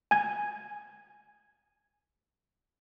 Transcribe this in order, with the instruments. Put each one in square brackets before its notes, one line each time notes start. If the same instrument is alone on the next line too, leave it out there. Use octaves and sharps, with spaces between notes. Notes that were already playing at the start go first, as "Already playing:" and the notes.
[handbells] G#5 G#6